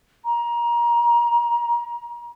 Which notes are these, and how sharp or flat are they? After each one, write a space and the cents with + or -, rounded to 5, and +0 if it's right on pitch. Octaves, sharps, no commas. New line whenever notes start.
A#5 +25